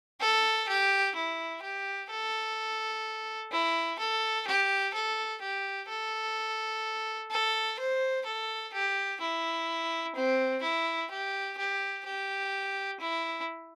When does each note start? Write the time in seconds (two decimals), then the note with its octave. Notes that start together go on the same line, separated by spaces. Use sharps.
0.21 A4
0.69 G4
1.15 E4
1.62 G4
2.11 A4
3.52 E4
4.00 A4
4.47 G4
4.94 A4
5.42 G4
5.89 A4
7.31 A4
7.79 C5
8.26 A4
8.73 G4
9.21 E4
10.15 C4
10.63 E4
11.11 G4
11.58 G4
12.06 G4
13.00 E4